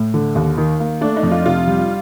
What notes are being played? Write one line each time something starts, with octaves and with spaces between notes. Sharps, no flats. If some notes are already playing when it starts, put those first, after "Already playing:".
Already playing: A2
D3
D#2
D#3
A#3
A3 D4
D#4
F2
F4
C3 F4
G3